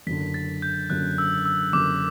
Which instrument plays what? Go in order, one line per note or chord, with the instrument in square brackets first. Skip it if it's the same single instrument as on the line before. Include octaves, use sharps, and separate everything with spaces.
[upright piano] F#1 F#2 D3 [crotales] B6
[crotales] A6
G6
[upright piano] F#1 F#2 D3 [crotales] F#6
[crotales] E6
E6
[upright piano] F#1 F#2 D3 [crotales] D6